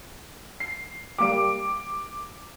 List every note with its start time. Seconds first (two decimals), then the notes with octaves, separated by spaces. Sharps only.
0.60 C7
1.18 G3 A#3 G4 D6 D7